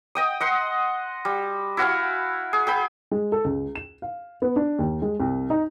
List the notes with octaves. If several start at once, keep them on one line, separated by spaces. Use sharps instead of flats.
D#5 G5 D#6
D#5 F#5 C6
G3
E4 F#4 F5 G#5
G#4
G#4 G5 B5
G#3
A4
C#2
E7
F5
B3
D4
D#2
G#3
C2
D#4